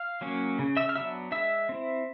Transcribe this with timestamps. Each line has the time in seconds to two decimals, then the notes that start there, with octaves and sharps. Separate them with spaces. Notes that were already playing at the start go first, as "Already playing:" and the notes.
Already playing: F5 F6
0.21 F#3 A#3 C#4
0.59 C#3
0.77 E5 E6
0.89 F6
0.95 F#3 B3 D4 E5 E6
1.32 G#3 E5 E6
1.69 C4 E4